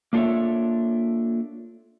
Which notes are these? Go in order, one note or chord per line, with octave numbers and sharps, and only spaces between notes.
A#3 D4 F4 A4 C#5 E5